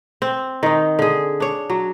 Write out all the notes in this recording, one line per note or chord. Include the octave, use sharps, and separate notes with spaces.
C4
D#3 D#4
D3 G#4
D4 C#5
F#3